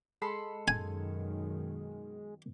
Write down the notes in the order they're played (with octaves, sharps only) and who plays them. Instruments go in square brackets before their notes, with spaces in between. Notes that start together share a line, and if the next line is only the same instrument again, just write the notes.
[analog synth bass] G#3 [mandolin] A4 B5 C6
[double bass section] F#2 B2 D#3 [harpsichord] G#5